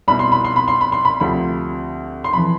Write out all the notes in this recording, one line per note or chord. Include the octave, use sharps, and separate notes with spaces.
C2 B2 B5
C6
B5
C6
B5
C6
B5
C6
B5
D2 C3 F3 B5
C6
F2 E3 B5